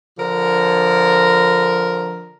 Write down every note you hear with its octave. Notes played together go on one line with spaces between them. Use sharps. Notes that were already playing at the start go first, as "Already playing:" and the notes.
D3 F3 A#4